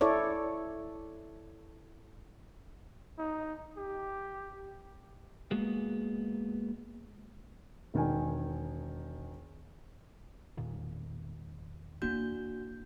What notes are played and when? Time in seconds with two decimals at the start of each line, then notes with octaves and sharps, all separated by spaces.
0.01 E4 A4 C#5 D5
3.19 D#4
3.77 G4
5.51 G#3 A#3 B3 F#4 G#4
7.94 E1 D#3 G#5
10.57 E1 A#2 D#3
12.02 A#3 D4 E4 F#4 G6